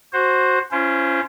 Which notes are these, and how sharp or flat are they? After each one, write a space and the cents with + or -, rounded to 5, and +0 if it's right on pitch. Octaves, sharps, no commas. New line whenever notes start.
F#4 +0 C5 +10
C#4 +0 F4 -45 C5 +0